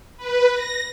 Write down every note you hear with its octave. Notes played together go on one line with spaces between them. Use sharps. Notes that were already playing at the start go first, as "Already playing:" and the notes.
B4
A#6